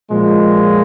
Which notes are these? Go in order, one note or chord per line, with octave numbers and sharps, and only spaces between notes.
A#2 F3 G#3